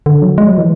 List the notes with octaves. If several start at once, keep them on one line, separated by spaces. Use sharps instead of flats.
D3
F#3
G#3
F#3
E3